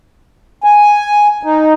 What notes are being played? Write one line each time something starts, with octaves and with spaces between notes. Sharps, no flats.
G#5
D#4